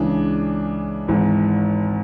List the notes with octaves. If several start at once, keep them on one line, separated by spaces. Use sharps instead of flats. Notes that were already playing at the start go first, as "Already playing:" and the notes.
Already playing: C#2 C#3 E3 D4
G#1 G#2 E3